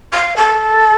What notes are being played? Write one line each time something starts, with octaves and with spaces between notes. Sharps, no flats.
F5
A4